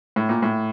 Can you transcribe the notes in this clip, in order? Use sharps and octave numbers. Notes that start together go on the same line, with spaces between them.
A2
A#2
A2